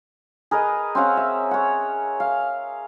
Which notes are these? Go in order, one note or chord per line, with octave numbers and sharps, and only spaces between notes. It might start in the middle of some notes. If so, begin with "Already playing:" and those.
G#4 A#4 B4 D#5
C4 C#4 F5 F#5
E5
C#5 F#5
F5